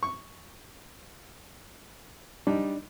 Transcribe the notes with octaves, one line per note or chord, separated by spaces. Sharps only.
C#6
G3 D4 D#4